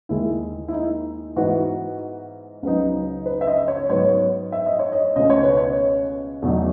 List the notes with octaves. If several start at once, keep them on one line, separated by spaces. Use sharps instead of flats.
D#2 D#3 G#3 E4
E4
D#4
G#2 E3 B3 D#4 F#4
C#2 C#3 F#3 B3 D#4
B4
E5
D#5
C#5
G#2 F#3 B3 C#5
E5
D#5
C#5
D#5
C#2 B2 A3 C#4 D#5
C#5
B4
C#5
E2 B2 F#3 A3 D#4